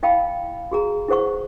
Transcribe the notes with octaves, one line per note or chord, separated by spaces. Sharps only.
E4 D#5 F5 G5 A5 B5
F#4 G#4 A#5
E4 G#4 C5 F#5 C#6